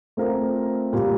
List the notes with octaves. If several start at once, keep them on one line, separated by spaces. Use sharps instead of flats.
A3 C4 F4 A#4
A#2 G3 A#3